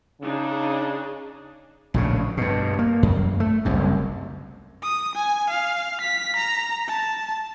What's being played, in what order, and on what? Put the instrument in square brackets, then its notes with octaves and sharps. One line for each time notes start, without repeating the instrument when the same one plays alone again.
[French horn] C#3 [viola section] D4 D#4 G#4
[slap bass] A#1 A2 C#3
G2 B2
A#3
F#2
A3
F#1 C2 F#2
[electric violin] D#6
G#5
F5
B6
A#5
A5